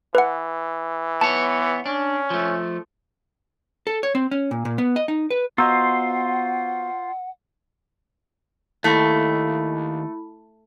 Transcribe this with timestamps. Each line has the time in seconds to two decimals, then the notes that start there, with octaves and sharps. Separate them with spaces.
0.15 E3 B4 F#5
1.21 B3 C#5 A5
1.86 C#4 D4
2.30 F3 A3
3.87 A4
4.03 C#5
4.15 C4
4.31 C#4
4.51 A#2
4.65 A#2
4.78 B3
4.96 D#5
5.08 D#4
5.30 B4
5.58 B3 F4 F#4 C5 D#5 F#5 A#5 E6
8.84 D#2 A3 E4 B5